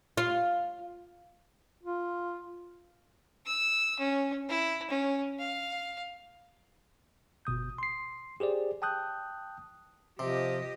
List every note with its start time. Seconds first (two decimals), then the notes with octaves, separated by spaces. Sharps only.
0.17 F4
1.83 F4
3.46 E6
3.99 C#4
4.49 E4
4.90 C#4
5.39 F5
7.45 G1 B2 D#6 G6
7.78 C6 C7
8.40 G4 G#4 C5 D5
8.82 G5 A5 D#6 F#6 G6
10.19 C3 F3 G4 D#5